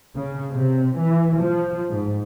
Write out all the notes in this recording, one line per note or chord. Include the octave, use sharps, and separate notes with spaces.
C#3
C3
E3
F3
G#2